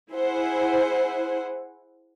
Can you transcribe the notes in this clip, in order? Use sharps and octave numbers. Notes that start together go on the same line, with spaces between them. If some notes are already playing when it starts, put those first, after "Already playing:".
E4 G#4 C5 F#5